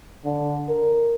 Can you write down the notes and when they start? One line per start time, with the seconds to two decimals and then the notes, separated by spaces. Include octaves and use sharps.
0.25 D3
0.69 A#4